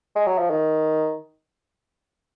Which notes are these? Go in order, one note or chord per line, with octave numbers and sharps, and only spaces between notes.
G#3
F#3
F3
D#3